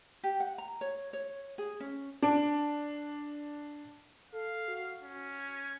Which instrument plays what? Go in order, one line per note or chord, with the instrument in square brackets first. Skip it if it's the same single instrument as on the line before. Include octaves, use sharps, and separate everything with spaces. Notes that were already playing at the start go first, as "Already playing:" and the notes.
[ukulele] G4
F#5
A#5
C#5
C#5
G#4
C#4
[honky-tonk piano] D4 D7
[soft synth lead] A4 [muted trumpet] F5
[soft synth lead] F#4
[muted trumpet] C#4
[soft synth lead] G#6